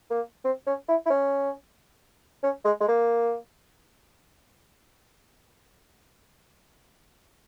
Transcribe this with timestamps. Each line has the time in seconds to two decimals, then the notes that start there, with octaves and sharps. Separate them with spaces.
0.10 A#3
0.44 C4
0.67 C#4
0.88 E4
1.05 E4
1.10 C#4
2.43 C#4
2.65 G#3
2.80 G#3
2.88 A#3